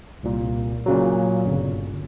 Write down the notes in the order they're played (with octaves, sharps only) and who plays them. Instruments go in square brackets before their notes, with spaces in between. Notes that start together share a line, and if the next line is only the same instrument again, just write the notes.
[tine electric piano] C2 A#2
A#2 C#3 F#3
G1